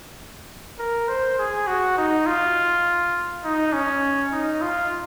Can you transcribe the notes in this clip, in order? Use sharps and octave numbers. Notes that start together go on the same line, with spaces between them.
A#4
C5
G#4
F#4
D#4
F4
D#4
C#4
D#4
F4